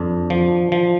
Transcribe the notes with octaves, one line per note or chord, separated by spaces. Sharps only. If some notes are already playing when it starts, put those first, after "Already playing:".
Already playing: F2 D4
F3
F3